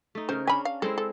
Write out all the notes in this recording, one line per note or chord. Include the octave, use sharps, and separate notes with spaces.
A3 D#4
C#3 A#4 C5
C#4 D4 G#5 B5
F5
G#3 C4 E4 A4
A4